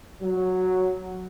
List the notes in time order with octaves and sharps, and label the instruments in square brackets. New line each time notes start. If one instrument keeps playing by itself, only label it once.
[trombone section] F#3